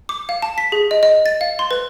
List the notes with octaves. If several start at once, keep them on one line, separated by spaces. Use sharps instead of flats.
D6
F5
A5
B6
G#4
D#5
D#5
A6
F5
C6
B4